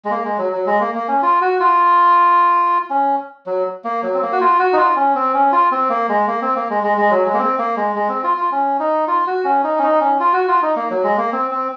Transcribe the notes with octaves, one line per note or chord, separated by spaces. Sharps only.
G#3
A#3
G#3
F#3
F#3
G#3
A#3
A#3
C#4
F4
F#4
F4
C#4
F#3
A#3
F#3
C4
A#3
F#4
F4
F#4
D#4
F4
C#4
C4
C#4
F4
C4
A#3
G#3
A#3
C4
A#3
G#3
G#3
G#3
F#3
G#3
A#3
C4
A#3
G#3
G#3
C4
F4
F4
C#4
D#4
F4
F#4
C#4
D#4
C#4
D#4
C#4
F4
F#4
F4
D#4
A#3
F#3
G#3
A#3
C4
C4